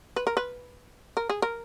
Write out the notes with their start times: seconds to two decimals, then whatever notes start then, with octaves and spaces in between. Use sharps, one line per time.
0.16 B4
0.27 A#4
0.37 B4
1.17 A#4
1.29 G#4
1.42 A#4